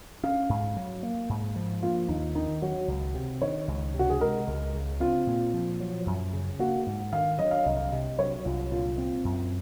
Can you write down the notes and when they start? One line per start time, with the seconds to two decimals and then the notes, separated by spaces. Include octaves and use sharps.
0.23 C#4 F5
0.49 G#2
0.76 F#3
1.03 A#3
1.29 G#2
1.56 F3
1.82 A#3 F4
2.08 D#2 D#4
2.35 D#3 D#4
2.62 F#3 F#4
2.88 C#2
3.14 C3
3.42 D#3 C#5
3.68 C#2
3.94 C3
3.99 F#4
4.10 G#4
4.21 G#3 A#4
4.48 C#2
4.74 C#3
5.00 C4 F4
5.27 A#2
5.54 F3
5.80 F#3
6.07 F#2
6.33 C#3
6.59 A#3 F#4
6.86 G#2
7.13 D#3 F5
7.39 F#3 D#5
7.51 F5
7.63 C2 D#5
7.77 F5
7.89 C3 D#5
8.18 F#3 C#5
8.45 C2 F4
8.72 A#2 F4
8.98 C4
9.25 F#2